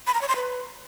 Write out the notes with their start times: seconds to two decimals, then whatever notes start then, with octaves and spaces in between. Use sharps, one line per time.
0.07 B5
0.14 A#5
0.21 C#5
0.28 C6
0.36 B4